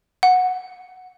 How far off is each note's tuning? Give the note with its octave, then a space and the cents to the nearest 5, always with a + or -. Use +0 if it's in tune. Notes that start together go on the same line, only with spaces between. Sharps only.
F#5 -10